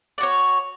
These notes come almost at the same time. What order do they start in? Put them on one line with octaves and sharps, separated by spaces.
D5 F#4 C#5